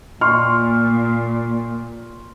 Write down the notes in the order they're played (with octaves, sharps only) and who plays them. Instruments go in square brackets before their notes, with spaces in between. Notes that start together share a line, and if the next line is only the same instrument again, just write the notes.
[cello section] A#2 [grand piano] C6 C#6 F6